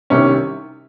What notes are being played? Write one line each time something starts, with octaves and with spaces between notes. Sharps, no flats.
C2 C3 D#3 C#4